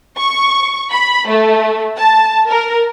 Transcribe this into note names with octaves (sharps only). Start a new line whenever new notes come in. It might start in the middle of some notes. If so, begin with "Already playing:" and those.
C#6
B5
A3
A5
A#4